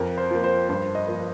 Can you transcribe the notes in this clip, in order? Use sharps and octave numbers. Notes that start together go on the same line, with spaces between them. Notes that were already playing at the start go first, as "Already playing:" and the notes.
Already playing: F2 A#4
C5
F3 A#3
C5
G2 C5
D#5
F3 A#3